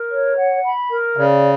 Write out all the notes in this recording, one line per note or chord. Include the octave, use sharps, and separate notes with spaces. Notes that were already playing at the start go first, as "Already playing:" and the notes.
Already playing: A#4
C#5
F#5
B5
A#4
C#3 D5